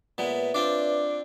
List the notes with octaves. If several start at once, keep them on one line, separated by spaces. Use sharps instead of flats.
A#2 G#3 B3 B4 C#5 E5
C4 D4 F4 D5